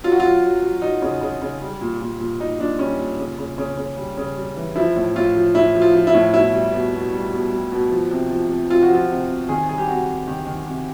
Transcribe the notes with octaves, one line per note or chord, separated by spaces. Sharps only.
F#3 F4
F#4
F#3 F4
F#3
F#3
F#3 D#4
C#3
C#3
C#3
G3
A#2
A#2
A#2
A#2 D#4
A#2 D4
G3 C#4
A#2
C#3
C#3
C#3
C#3
G3
C#3
G3
E3
F3 E4
A2
A2 F4
F3
A2 E4
F3
F4
F3
E4
A2
B2 E4
G3
B2
B2
G3
B2
G3
B2
F3
C3
F3
C3
C3 F4
F#4
F3 F4
C3
C3
D#3 G#4
G3 G#4
G4
C3 F#4
C3
D#3 G4
D#3
C3